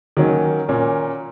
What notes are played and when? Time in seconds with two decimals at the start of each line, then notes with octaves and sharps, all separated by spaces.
0.17 D#3 F#3 A#3 C#4
0.69 A#2 A#3 C#4